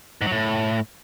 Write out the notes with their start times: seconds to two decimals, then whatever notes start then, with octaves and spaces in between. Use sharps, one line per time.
0.21 G#2
0.27 F#3
0.32 A2